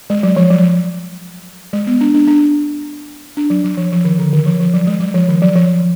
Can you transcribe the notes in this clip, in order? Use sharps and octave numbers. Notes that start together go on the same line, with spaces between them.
G#3
F#3
F3
F#3
G#3
B3
D4
D4
D4
D4
F#3
F#3
F3
F3
D#3
D3
D#3
F3
F3
F#3
G#3
F#3
F3
D#3
F#3
F3